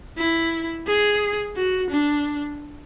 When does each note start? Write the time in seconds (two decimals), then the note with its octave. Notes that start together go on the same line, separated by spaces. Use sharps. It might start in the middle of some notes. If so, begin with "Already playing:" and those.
0.18 E4
0.87 G#4
1.56 F#4
1.90 D4